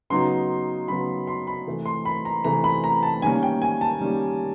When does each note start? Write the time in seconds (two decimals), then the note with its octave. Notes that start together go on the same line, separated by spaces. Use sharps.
0.10 C#3 F#3 B3 D#4 C6
0.88 C#3 F#3 B3 D#4 B5
1.27 C6
1.47 B5
1.67 C3 E3 A3
1.86 C6
2.05 B5
2.25 A#5
2.44 C3 E3 A3 A#5
2.64 B5
2.84 A#5
3.03 A5
3.22 D#3 G3 A#3 C#4 G#5
3.43 G5
3.62 G#5
3.81 A5
4.00 D#3 G3 A#3 C#4